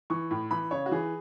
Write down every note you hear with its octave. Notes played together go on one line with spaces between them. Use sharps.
E3 C#6
A2
E3 B5
C#3 C#5
F#4
E3 G#4